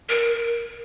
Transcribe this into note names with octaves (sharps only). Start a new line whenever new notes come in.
A#4